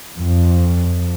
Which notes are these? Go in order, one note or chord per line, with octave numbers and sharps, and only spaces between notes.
F2